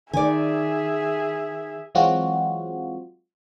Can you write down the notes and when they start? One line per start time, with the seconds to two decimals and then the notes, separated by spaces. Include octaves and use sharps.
0.13 D#3 G#4 D5 E5 G#5
1.95 E3 F#3 G#3 C4 F4 F#4